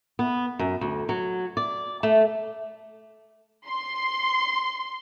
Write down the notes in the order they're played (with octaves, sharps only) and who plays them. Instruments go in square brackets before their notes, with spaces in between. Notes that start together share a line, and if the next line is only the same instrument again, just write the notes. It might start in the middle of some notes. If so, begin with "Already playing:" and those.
[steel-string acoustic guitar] B3
F#2
D2
F#3
D5
A3
[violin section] C6